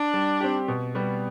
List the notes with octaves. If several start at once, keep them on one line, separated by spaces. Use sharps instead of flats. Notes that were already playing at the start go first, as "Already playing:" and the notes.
Already playing: D4
G3
C4 G4
B2
G3 B3